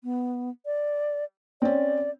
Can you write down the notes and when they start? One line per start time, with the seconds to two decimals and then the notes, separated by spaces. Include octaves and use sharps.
0.04 B3
0.66 D5
1.62 C4 C#4 D5